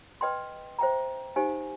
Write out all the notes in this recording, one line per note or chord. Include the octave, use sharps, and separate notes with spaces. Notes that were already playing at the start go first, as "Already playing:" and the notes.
B4 D#5 G5 C6
C5 E5 G5 A#5
D#4 G4 C5 F5 G#5